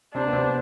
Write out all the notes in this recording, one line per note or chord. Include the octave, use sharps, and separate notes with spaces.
C3 C4 D4
B3
C3 C4